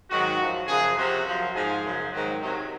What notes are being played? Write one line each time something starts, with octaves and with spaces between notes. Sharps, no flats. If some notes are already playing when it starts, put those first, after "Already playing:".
G#2 D#3 F#3 F#4
F#2 F3
F#2 C#3 F3 G#4
C3 F3 F#4
F#2 F3
G#2 F3 G#4
F#2 C#3 F3
G#2 D#3 F#3
C3 D#3 F#3